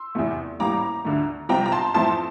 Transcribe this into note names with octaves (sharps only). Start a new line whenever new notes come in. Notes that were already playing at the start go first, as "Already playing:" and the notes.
Already playing: C6 E6
F1 E2 C3 E3 A3
A1 A2 E3 G3 A#3 A#5 D6
D2 D3 A3
C2 C3 F3 C4 G5 A#5
A#5
A5 C6
F2 E3 A3 C4 A5 C6